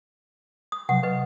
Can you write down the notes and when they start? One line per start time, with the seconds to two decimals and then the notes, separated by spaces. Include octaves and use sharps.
0.72 D#6
0.89 C3 F#3 F#5
1.03 B4 D#5